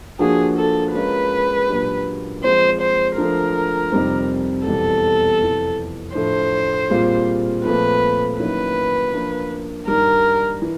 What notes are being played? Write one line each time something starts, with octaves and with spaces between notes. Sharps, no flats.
D3 F3 A#3 D4 F#4 G#4
A4
G#3 C#4 F4 A#4 B4
A#2 F#3 A#3 D4 G4
F3 G#3 C4 C5
C5
D3 F3 A3 A#4
F2 C3 D#3 G3 C4
E2 B2 G3 C4 A4
F2 C3 E3
A2 F3 A3 D4 C5
A#2 G3 C4 F4 G#4
A#2 F3 A3 C4 B4
D#3 F#3 A#3 C#4 E4 B4
F3 A#3 D4 F4 A#4
G2 D#3 G3 A#4
E3